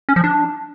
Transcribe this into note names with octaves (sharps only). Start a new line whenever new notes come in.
C#4
F3
D4